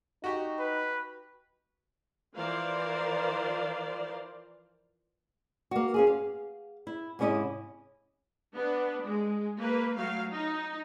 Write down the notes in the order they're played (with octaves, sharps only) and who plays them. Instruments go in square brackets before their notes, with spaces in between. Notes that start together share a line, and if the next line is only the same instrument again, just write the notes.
[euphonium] D#4 [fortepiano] F#4 G4
[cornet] B4
[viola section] E3 F3 A#4 C5 D5 F5
[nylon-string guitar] A#3 F#4
C#4 F4 G#4
F5
E4
G#2 C3 C#4 E4 D#5
[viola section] B3 D4
G#3
A#3 B4
F#3 A3 F5
D#4